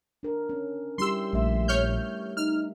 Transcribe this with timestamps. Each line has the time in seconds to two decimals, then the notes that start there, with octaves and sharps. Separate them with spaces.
0.23 D4 A#4
0.49 C#4
0.98 G3 E4 G4 C6 E6
1.33 A#1 G3 A3 E5
1.68 C#5 F6 G6
2.37 D#4 F6